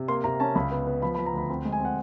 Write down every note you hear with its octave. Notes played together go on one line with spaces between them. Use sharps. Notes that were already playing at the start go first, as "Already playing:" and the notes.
Already playing: C3
A#3 C6
C3 A#5
C#4 A5
C#2 B5
B3
B3
F3 B5
B5
F3
A#5
D2 B5
C4 B5
G#3
G#5
C4 F#5